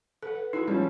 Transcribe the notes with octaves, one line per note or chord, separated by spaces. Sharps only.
A4 B4 F#5
D#4 E4 F#4 G#4
F3 G3 C#4